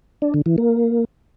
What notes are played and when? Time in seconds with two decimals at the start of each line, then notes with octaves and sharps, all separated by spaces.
0.22 D4
0.34 D3
0.46 E3
0.58 A#3